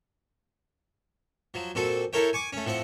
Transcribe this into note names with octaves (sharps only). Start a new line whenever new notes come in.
F3 F#3
A#2 C4 F#4 A4
E4 A4 A#4 C#5 G5
G#5 C#6 D6
A3 C#4
A2 F3 C4 F#5